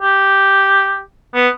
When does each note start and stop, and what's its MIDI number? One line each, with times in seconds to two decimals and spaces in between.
0.01 1.01 67
1.34 1.48 59